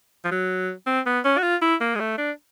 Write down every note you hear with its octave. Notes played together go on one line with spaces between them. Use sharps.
F3
F#3
C4
B3
C#4
F#4
F4
E4
A#3
G#3
A3
D4